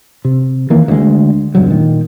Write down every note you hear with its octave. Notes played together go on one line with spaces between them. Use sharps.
C3
D#3 E3 A#3
D2 G#3
E1 C#2 G2 F#3
A#2 D#3